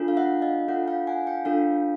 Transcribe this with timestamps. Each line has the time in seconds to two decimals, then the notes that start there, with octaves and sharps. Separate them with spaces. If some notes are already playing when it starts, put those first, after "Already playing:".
Already playing: D4 F4 A4
0.08 F5
0.17 E5 F#5
0.42 D#5 F5
0.68 D4 F4 A4 E5 F#5
0.88 F5 G5
1.07 F#5 G#5
1.27 F5 G5
1.45 D4 F4 A4 F5 G5